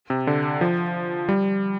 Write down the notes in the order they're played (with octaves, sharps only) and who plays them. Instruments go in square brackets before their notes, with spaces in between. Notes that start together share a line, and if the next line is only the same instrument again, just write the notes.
[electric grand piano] C3
D3
F3
G3